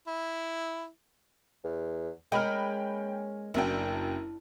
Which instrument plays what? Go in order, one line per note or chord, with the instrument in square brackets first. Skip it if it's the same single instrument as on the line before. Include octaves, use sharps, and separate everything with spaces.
[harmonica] E4
[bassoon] E2
[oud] G#3 A#3 [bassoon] C#4 [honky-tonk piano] G5 B5 F6
[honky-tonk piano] F#1 F#2 G5 [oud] D4 E4